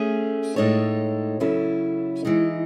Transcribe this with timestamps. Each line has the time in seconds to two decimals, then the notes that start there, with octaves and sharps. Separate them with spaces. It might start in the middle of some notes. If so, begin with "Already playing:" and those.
Already playing: A3 C#4 G#4
0.56 A2 G#3 D#4 A4 C#5
1.40 C#3 F#3 C#4 E4 A4
2.25 E3 G#3 D#4